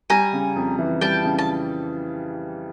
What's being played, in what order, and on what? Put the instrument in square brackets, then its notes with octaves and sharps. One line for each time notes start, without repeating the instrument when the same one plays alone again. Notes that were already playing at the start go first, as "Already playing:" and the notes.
[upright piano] G3 [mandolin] G#5 A#5
[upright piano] C#3
F2
E3
[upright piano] G3 [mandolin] G5 A5
[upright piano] C#3
[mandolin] A5